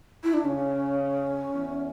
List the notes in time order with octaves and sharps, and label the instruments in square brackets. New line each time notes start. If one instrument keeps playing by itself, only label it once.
[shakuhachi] E4
D4
[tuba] C#3 [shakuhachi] C#4
[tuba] E2